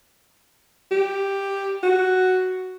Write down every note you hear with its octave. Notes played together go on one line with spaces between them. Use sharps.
G4
F#4